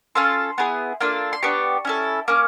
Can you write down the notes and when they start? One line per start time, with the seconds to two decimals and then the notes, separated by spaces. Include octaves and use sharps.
0.15 C#4 F4 A4 C6
0.58 B3 E4 G#4
1.00 A#3 D4 F4 A4
1.33 C6
1.43 B3 D4 G4 C#6
1.85 C#4 E4 A4
2.28 A#3 C#4 D6